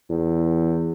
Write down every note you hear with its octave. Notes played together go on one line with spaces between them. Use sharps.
E2